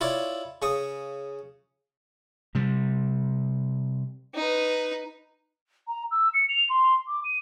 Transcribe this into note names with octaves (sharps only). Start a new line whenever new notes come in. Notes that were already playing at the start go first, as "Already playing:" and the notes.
E4 F4 C#5 D5
C#3 C#6 D#6
C3 G3
D#4 B4
A#5
E6
C#7
F7
C6
D6
D#7